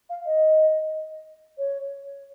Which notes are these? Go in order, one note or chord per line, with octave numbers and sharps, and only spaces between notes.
F5
D#5
C#5